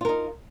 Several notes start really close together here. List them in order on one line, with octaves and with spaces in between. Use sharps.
F4 A#4 D#4